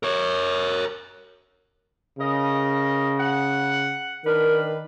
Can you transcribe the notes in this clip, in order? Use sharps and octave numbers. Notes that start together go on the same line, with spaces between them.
A#4 C#5
C#3 A#4 D#5
F#5
D#3 D4 A#4 B4